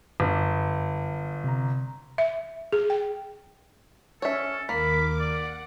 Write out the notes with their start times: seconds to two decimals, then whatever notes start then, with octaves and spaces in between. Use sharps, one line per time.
0.20 G1 F#2
1.44 C3 A#5
2.18 E5
2.73 G#4
2.90 G5
4.22 C#4 A4 C#5 E5
4.69 D#2 A#3 A#4 B5 D6
5.19 D5 F#5